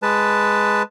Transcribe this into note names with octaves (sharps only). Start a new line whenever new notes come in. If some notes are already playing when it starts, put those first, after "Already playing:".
G#3 B4 A5